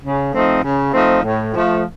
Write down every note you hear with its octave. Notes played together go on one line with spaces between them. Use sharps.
C#3
F3 A3 C4 D#4
C#3
F3 A3 C4 D#4
A2
F3 A3